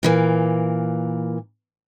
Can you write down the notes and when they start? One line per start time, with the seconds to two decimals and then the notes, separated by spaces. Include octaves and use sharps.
0.03 A#2 E3 A#3